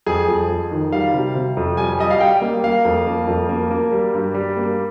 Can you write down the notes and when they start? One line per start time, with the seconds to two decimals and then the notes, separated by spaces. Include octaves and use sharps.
0.06 F2 G#4
0.28 F2
0.49 F2
0.71 D#3
0.92 G3 F5
1.14 C3
1.35 C3
1.57 F2
1.77 G3 G#5
1.99 G3 D#5
2.10 F5
2.21 G3 G5
2.42 A#3
2.64 A#3 F5
2.85 F2
3.07 A#3
3.27 F2
3.49 A#3
3.71 A#3
3.92 G3
4.14 G2
4.34 G3
4.57 A#3